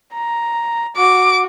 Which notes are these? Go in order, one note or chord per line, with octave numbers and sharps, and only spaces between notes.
A#5
F#4 D6